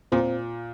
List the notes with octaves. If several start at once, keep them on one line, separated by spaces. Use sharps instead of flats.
A#2 C4